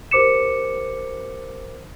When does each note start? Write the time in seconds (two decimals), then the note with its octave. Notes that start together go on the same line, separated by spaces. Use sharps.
0.11 G4 A#4 C5 D6 C#7 E7